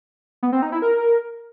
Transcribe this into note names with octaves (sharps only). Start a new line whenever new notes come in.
B3
C4
D#4
E4
A#4